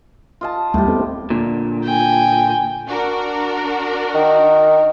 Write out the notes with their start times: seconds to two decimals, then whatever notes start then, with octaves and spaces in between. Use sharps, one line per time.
0.41 F4 D#5 A5
0.74 D#2 A2 G3 A3 G4
0.88 B3 C4 A4
1.30 A#2 D3
1.84 G5 G#5
2.88 D4 F#4 A#4
4.15 D#3